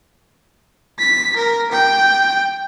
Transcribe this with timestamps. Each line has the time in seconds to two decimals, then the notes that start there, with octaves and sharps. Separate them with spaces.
0.99 B6
1.37 A#4
1.72 G5